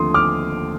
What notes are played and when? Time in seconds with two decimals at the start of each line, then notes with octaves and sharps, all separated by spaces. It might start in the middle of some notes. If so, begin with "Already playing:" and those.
Already playing: D#2 D3 F3 A3 C4 C6 D#6
0.14 D6 F6